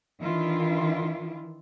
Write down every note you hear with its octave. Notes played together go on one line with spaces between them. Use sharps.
D#3 E3 D4 E4 F4